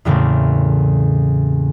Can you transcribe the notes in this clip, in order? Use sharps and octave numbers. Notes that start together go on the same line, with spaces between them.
E2 A2 C#3 A3 A#3 C4